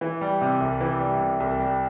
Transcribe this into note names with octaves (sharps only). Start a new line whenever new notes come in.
E3
G3
C3
C2
E3
G3
C3
C2
G3